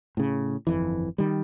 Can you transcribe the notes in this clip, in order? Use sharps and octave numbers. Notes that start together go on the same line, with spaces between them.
A2 C#3
G1 F2 E3
D#3 G3